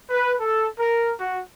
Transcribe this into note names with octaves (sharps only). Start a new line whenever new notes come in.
B4
A4
A#4
F#4